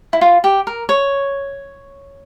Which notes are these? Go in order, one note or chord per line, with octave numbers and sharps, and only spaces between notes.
E4
F4
G4
A#4
C#5